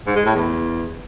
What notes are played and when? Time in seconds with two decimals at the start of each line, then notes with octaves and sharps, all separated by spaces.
0.06 G#2
0.16 G#3
0.25 A2
0.35 E2